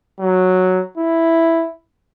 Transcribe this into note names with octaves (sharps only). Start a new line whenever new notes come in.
F#3
E4